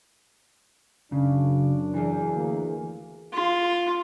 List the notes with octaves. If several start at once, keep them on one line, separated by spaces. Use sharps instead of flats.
F#2 C#3 D4
E3 G#4
D2 A#3
F4